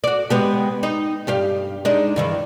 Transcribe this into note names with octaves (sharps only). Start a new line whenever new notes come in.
F#4 D5
G#3 B3 G4
D#4
G2 G4 F5
G#3 D4 D#4
G2 D#3 E3